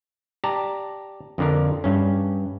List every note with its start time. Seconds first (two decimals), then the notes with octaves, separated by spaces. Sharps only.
0.44 G4 D5 A5 A#5
1.38 F2 D3 A#4
1.84 G2 C#4